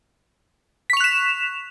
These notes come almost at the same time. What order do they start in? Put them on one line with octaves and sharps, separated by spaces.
B6 C#6 F7 F#6 E7